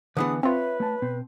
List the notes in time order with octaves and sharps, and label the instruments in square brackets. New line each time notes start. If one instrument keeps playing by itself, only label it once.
[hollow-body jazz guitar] D3 E3 B3 [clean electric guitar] D4 G#4 B4 [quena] D#6
[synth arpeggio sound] C4 F4 [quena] B4 [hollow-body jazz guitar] C#5 [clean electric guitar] E5
[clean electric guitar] A3 A5
B2 C4